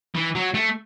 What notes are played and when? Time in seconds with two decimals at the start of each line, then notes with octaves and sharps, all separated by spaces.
0.15 E3
0.35 F#3
0.54 A3